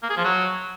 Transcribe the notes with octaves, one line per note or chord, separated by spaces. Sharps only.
A#3
G#4
F3
F#3